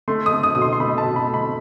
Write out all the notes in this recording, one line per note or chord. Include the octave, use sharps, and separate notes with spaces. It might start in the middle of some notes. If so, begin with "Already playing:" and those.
A3 C6
D#6
A3
D#6
B2 D#6
C6
C6
A3 B5
A5
B2
B5
A3
B5